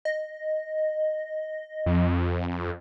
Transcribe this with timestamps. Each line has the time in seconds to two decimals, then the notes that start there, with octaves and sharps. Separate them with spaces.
0.05 D#5
1.86 F2